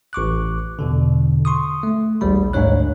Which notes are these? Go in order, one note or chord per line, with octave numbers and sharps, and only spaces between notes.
A1 C#6 D6 F#6
E2 B2 D3
C6 C#6 D#6
A3
A#1 D#2 G3 B5
D2 G#2 D4 D#4 C#5 F#6